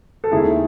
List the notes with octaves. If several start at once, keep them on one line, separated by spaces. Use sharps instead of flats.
A4
D#2 D#3 G#3 E4 G#4